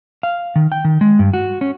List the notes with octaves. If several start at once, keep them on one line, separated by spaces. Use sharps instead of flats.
F5
D#3
G5
D#3
G#3
G2
F#4
C#4